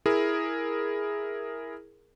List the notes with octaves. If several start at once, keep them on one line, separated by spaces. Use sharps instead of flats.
E4 G#4 A#4